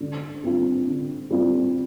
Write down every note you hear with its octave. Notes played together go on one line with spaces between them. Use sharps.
D3
G3 C4 F4
D3
G3 C4 F4